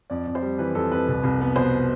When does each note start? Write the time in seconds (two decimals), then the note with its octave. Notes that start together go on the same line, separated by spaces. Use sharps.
0.10 F2 D5
0.27 F2
0.35 C5
0.42 G3
0.58 E3 B4
0.75 F2 A4
0.91 F2 B4
1.08 C2
1.23 C2
1.41 B3
1.56 B2 C5